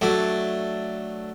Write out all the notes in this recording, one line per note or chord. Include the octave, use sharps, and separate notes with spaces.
F#3 A3 D4